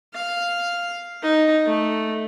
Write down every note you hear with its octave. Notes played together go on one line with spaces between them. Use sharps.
F5
D#4
A3